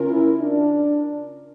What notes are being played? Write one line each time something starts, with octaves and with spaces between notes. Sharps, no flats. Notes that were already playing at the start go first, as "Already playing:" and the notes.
Already playing: C#3 C#4 F4 A#4
E4
D4